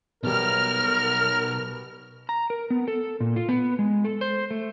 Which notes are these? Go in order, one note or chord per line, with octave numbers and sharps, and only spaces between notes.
B1 B2 G3 A#4 F6
A#5
A#4
B3
A4
A#2
F4
B3
G#3
A4
C5
A3